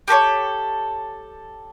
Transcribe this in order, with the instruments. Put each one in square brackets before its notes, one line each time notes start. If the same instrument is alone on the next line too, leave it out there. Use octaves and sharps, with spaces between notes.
[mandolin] G4 A4 B4 C#5